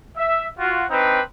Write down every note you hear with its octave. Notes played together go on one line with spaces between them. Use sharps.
E5
F4 F#4
C4 D4 D#4 B4